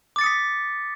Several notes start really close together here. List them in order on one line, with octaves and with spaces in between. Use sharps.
D6 A6 C#7 D#6 B6